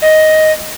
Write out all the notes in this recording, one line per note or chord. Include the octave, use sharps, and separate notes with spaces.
D#5